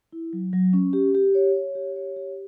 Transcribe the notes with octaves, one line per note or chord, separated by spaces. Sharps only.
E4
F#3
F#3
C#4
G4
G4
C#5
C#5
G4
C#5
G4